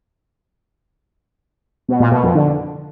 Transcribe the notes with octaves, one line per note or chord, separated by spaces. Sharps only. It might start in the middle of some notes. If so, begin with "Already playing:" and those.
B2
A#2
B2
F2
D3